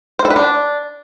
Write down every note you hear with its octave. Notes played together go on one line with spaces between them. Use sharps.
C5
A4
B4
D4